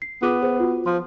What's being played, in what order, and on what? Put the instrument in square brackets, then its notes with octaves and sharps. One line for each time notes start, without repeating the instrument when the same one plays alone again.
[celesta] C7
[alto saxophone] B3 [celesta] F4 G#4 D6
[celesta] G#4 C5
F4 F#4
[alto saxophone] F3 [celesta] C6